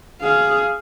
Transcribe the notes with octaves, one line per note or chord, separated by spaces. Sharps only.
G#4 F5